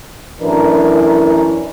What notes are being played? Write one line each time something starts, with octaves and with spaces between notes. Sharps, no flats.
F#2 A2 E3 D4 A#4